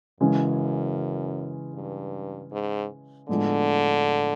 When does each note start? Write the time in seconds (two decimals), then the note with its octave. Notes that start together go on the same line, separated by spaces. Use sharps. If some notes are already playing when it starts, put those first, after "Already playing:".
0.21 F#2 C#3 E3 G#3 C#4
1.74 G2
2.52 G#2
3.29 A2 D3 F3 G#3 B3 D4